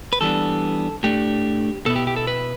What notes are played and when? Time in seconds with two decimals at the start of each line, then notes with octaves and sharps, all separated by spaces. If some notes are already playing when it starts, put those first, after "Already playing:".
0.13 B4
0.21 E3 G3 B3 D4 A4
1.03 A2 A3 D4 G4
1.86 B2 B3 E4 A4
1.96 G4
2.07 G4
2.16 A4
2.27 B4